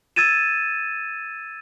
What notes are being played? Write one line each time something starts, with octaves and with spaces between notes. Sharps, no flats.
E6 G#6 A6 D#7 E7